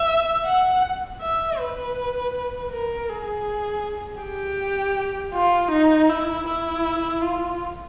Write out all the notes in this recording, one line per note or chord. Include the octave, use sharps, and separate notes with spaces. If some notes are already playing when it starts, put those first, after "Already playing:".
Already playing: E5
F#5
E5
B4
A#4
G#4
G4
F4
D#4
E4
E4
F4